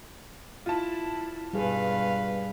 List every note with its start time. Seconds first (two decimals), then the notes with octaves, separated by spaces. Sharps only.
0.66 E4 F4 A5
1.53 G2 B2 G3 G#4 B4 F5